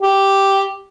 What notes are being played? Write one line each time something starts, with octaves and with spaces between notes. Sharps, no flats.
G4